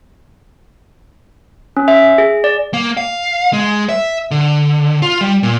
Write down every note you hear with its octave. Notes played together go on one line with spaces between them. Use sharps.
C#4
E5
G#4
D5
A#3
F5
G#3
E5
D3
F4
G3
A#2